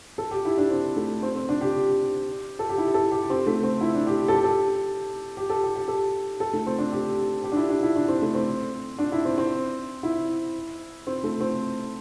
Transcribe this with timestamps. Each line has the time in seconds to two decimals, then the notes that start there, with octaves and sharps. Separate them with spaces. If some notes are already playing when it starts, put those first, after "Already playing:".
0.18 A4
0.31 G4
0.45 E4
0.58 D4
0.71 C4
0.96 A3
1.23 C4
1.36 C4
1.49 D4
1.61 G4
2.59 A4
2.69 G4
2.78 E4
2.94 A4
3.12 G4
3.30 C4
3.47 A3
3.63 C4
3.81 E4
3.95 D4
4.07 G4
4.28 A4
4.35 G4
4.44 A4
5.37 G4
5.50 A4
5.63 G4
5.75 G4
5.88 A4
6.40 A4
6.53 A3
6.67 C4
6.78 D4
6.92 G4
7.44 G4
7.52 D4
7.56 E4
7.69 D4
7.83 E4
7.96 D4
8.08 C4
8.22 A3
8.34 C4
8.98 D4
9.12 E4
9.25 C4
9.38 C4
10.03 E4
11.07 C4
11.24 A3
11.41 C4